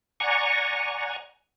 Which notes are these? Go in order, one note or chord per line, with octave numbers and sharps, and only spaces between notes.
D5 F#5 G#5 A#5 C#6